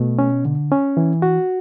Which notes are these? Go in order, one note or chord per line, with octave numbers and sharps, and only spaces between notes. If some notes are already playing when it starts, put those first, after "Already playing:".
Already playing: B2 A3
C#4
D3
C#4
E3
F#4